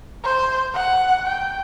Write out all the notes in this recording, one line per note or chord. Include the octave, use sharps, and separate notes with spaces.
C5
F#5
G5